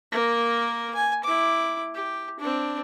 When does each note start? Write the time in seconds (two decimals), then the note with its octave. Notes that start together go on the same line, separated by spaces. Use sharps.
0.12 A#3 A#4
0.95 G#5
1.24 E4 D6
1.95 G4
2.40 C4 D4